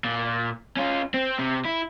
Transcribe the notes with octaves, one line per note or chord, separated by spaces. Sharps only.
A#2
C#4 F4
C4
C3
E4